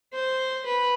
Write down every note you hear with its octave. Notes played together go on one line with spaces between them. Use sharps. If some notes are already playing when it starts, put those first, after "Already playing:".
C5
B4